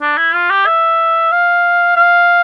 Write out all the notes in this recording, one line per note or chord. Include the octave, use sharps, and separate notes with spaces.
D4
E4
F4
G4
E5
F5
F5